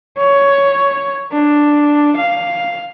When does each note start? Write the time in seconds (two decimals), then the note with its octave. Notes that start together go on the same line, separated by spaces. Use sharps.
0.18 C#5
1.32 D4
2.17 F5